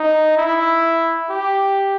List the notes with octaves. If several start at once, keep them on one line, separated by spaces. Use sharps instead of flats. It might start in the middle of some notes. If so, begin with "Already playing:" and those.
Already playing: D#4
E4
G4